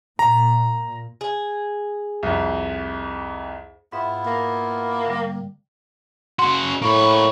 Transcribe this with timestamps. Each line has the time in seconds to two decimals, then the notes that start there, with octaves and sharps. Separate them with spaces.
0.19 A#2 A#5
1.21 G#4
2.23 C2 F2
3.92 G#2 B3 E4 F4 E5
4.27 A#3
5.05 D3 G3
6.39 C#3 F#4 C6
6.82 A2 A#3 B5 C#6